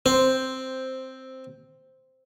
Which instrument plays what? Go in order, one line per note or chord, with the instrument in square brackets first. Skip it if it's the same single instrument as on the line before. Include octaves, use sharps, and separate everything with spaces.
[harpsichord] C4 [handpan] C5